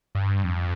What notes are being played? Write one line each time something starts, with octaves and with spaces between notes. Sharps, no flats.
G2
F2